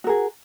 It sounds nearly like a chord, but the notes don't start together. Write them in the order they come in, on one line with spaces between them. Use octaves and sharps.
F#4 A#4 G#4